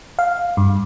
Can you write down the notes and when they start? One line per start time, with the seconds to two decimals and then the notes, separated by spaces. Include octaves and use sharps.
0.19 F5
0.57 G2